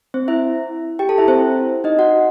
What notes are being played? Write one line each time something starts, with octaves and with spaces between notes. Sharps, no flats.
C4 C5
E4 E5
G4 G5
A4 A5
E4 E5
C4 C5
D#4 D#5
F#4 F#5